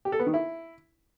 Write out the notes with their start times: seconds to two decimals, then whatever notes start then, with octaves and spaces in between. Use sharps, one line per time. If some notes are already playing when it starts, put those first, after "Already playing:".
0.05 G4
0.12 A4
0.19 B3
0.27 D#3
0.34 E4